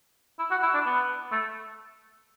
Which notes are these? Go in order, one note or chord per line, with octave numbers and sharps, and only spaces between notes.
E4
F#4
E4
D4
B3
A3